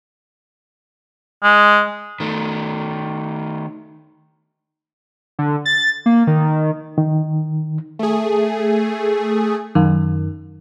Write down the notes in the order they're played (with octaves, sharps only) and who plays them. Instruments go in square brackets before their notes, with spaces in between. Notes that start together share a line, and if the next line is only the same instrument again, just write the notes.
[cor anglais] G#3
[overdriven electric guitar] D#3 A3
[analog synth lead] D3
A6
A#3
D#3
[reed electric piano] D#3
[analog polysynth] A3 G#4
[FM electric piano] F#2 D#3